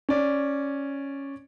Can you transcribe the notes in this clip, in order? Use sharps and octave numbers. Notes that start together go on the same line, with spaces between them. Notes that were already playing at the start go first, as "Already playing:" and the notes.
C#4 D5